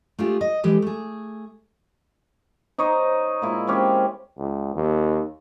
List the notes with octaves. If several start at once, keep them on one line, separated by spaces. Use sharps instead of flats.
A3 D4 F4 G4 G#4
D#5
E3 G#3 G4 A4
A3 G#4
D#4 C5 C#5 D#5
A#2 G#3 E4
G#3 C4 C#4 G4
C#2
D#2